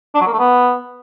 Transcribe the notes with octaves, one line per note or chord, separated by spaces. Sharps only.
D4
F#3
A#3
A3
B3